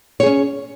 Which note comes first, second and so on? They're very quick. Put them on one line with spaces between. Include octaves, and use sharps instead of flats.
C#5 G#4 C#4